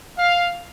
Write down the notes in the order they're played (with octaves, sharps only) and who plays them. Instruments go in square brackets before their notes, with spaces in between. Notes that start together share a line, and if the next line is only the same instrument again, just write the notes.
[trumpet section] F5